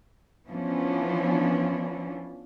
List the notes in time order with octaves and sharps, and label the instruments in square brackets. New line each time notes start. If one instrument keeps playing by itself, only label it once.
[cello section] E3 F3 B3 C#4 D4